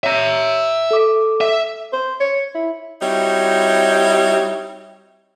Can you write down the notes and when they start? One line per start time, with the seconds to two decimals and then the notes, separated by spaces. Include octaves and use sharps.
0.04 C#5 E5 A#5
0.91 A4 D6
1.41 E5
1.93 C5
2.20 C#5
2.55 E4
3.01 G3 C4 D#4 E4 F#4 C#5